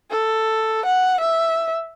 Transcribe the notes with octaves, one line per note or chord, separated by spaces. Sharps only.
A4
F#5
E5